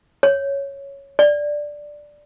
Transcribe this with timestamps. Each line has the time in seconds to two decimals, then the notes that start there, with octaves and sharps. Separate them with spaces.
0.23 C#5
1.19 D5